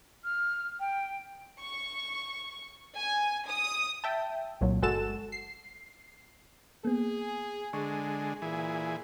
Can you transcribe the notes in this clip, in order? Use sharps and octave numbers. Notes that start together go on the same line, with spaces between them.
F6
G5
C#6
G#5
D#6
E5 G5 A5
C2 A#2 F#3
G1 G#3 F#4 A4 A5 E7
C7
A#3 B3 G#4
D3 G#3 C#6
A#2 E3 G#4